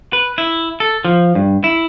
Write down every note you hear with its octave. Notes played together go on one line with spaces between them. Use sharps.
B4
E4
A4
F3
G2
E4